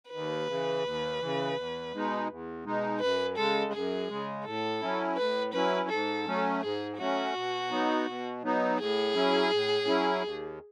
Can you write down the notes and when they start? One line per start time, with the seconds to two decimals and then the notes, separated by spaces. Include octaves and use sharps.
0.11 D#2 B4
0.48 C#3 E3
0.83 D#2
1.20 C#3 E3
1.56 E2
1.92 B2 G#3 D#4
2.28 E2
2.65 B2 G#3 D#4
3.00 F#2 B4
3.37 C#3 G#3 A4
3.72 F#2 G#4
4.09 C#3 G#3
4.45 A2 A4
4.81 F#3 C#4 E4
5.17 A2 B4
5.53 F#3 C#4 E4 B4
5.89 G#2 A4
6.26 F#3 A3 C#4
6.61 G#2 G#4
6.98 F#3 A3 C#4 F#4
7.35 B2
7.70 F#3 B3 D#4
8.07 B2
8.42 F#3 B3 D#4
8.79 A2 G#4
9.14 F#3 C#4 E4
9.51 A2
9.87 F#3 C#4 E4
10.23 D#2